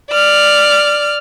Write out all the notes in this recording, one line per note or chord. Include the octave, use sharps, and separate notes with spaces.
D5 F6